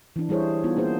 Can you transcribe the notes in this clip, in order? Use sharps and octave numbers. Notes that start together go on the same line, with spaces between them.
E3 D4
G3 E4 G#4 C5 C#5
B3 D#4 F4
A#3 D4 G#4 C5